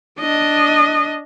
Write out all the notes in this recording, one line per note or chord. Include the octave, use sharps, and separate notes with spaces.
D4 D#5